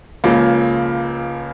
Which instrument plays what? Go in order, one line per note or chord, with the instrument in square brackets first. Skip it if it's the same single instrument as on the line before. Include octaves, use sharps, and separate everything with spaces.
[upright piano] C#2 C#3 F3 A#3